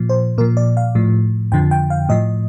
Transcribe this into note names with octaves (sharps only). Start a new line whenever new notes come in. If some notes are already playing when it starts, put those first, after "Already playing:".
Already playing: A#2 F3
C5
A#2 F3 A#4
D5
F5
A2 F3
F2 D3 F3 G5
G5
F5
A2 F3 D#5